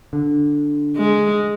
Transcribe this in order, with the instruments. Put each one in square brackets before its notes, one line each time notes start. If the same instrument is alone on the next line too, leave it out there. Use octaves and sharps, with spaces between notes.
[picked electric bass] D3
[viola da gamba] G#3